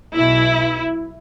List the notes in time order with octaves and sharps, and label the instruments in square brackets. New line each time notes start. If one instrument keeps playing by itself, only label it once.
[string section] B1 B2 E4